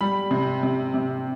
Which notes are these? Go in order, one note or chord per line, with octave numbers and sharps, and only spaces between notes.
G3 B5
C3
C3
C3